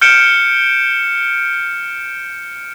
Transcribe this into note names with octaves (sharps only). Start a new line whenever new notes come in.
F6 G6 C#7 D7 E7